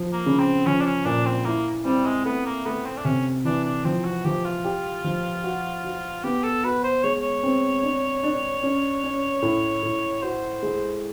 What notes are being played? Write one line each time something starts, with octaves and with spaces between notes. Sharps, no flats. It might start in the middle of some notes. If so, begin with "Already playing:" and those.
Already playing: F3
A#3
C#3
C4
F3 C#4
D4
C#4
A#2 D4
C4
A#3 E4
G3 C4
G#3
A3 B3
A#3
A3 B3
C4
D4
C3 C#4
E3 D4
D4
F3 C4
F#4
F3 G4
F4
G4
F3
F#4
F#4
B3 G4
A4
F#4 B4
C5
G#3 C#5
C#5
C4
D4
D4
C#4
C#4
A2
A2
F#4 C5
G#3